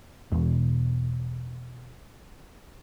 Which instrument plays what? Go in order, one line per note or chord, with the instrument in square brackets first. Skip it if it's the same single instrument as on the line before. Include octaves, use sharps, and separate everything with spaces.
[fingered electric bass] E1 B2